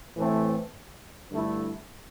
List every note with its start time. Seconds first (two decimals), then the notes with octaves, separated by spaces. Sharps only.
0.17 A2 E3 A3 C4
1.31 G2 D3 A3 E4